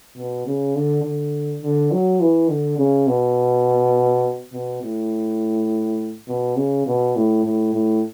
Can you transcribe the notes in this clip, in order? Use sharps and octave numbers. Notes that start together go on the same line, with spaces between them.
B2
C#3
D3
D3
D3
F#3
E3
D3
C#3
B2
B2
A2
B2
C#3
B2
A2
A2
A2